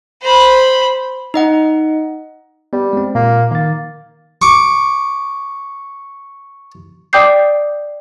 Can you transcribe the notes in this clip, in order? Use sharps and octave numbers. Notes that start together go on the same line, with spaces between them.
C5 B5
D#4 D#5 F#5
G3 B3
G#3 C4
A#2 A#3
D#3 A#3 A6
C#6 D6
D5 G5 D6 D#6 G6 C7